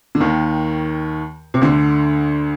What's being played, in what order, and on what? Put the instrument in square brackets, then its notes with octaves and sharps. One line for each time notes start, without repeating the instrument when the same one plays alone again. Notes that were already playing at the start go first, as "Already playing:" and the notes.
[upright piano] D3
D#2 D#3
C3
D2 D3